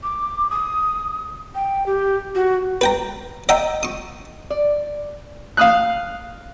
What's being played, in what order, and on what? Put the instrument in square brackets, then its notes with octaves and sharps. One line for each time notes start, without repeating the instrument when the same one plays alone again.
[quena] D6
D#6
G5
G4
F#4
[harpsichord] B4 G5 A#5
D#5 E5 F#5 G5 A#5 D#6
C#6 D#6
[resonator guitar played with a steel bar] D5
[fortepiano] F5 D#6 F#6